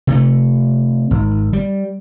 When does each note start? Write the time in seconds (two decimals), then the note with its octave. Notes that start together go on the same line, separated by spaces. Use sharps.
0.07 C3 A3
1.11 G#1
1.53 G3